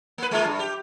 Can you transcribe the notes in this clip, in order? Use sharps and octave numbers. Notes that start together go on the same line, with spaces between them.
A#3 B4
G#3 A#3 F4
G2
G4